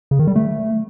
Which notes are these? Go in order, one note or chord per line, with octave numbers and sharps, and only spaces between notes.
C#3
D#3
G3
A3